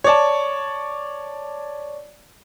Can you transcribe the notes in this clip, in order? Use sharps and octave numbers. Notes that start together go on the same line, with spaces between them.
C#5 D5 A5